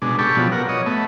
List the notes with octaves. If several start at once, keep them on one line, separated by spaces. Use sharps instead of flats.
B2 G#3 D4
G4 A4 B4 D5 C#6
B2 F3 F#3 B3
A#4 F#5
C#5 D#5
A3 B3